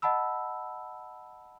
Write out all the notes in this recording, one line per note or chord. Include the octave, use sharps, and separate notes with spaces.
D#5 F#5 A5 B5 E6